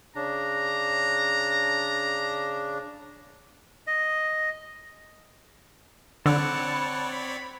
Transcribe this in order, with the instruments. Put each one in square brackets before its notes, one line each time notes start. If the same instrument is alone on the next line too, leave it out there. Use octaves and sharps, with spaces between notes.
[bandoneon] C#3 D4 [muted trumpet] A#5
[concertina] D#5
[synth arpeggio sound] D3 [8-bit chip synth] C4 C#5 D5 [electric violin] F#5 A5 [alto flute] B5
[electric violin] B5